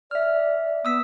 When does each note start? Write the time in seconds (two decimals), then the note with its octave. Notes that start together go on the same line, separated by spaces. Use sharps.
0.11 D5 E5 F6
0.85 B3 D#6 E6 B6